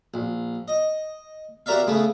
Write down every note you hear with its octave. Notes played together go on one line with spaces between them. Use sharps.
A#1
D#5
F#4 G4 A#4 D5 E5 F5
C#3 A3 B3